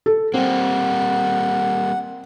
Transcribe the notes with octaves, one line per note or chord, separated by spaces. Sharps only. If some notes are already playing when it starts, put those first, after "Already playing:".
A4
G3 A#3 C4 F#5